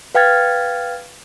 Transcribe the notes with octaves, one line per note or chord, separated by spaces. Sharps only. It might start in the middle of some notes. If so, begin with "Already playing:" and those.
B4 F5 G5 F6 G#6 A6